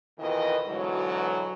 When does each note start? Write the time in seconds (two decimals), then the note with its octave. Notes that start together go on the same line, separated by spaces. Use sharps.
0.19 F2 B2 D#3 E3 B4 D#5
0.67 G#2 B2 D3 E3 F#3